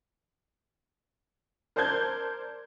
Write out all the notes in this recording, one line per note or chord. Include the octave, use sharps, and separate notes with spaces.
A#4 C5 D5 A5 G6 G#6